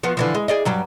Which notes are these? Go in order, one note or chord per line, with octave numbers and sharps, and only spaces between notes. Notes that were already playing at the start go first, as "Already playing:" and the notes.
F3 B3 F#4
D3 E3 F3
G#3
G#4 D5 D#5
G2 F#3 G3